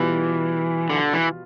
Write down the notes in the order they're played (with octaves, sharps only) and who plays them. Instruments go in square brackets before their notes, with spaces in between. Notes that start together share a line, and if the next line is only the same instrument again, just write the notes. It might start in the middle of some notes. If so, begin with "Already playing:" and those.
Already playing: [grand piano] B2 G3 F4 [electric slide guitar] E3
[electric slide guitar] D3
E3